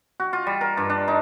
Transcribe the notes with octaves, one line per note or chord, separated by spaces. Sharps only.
F#4
F4
G3
A#4
G2
D4
D#4